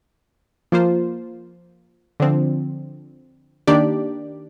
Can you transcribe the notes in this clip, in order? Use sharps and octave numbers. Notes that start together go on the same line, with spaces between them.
F3 A#3 F4 C5
D3 F3 C4
D#3 A#3 D4 G4 D5